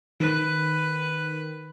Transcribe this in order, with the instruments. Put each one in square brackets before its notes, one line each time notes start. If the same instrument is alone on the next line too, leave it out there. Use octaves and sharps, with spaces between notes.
[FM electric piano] D#3 [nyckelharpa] B4